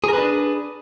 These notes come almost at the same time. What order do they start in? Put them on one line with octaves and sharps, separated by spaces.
G#4 A#4 B4 D4